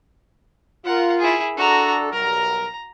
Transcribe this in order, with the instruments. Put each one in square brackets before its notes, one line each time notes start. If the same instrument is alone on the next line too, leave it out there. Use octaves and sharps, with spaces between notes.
[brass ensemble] F4 [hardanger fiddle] A#4 F#5
[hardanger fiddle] E4 G#4
[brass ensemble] D4 A4 [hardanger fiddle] F#4 A#5
[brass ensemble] B1 G3 A#4 [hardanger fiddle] A#5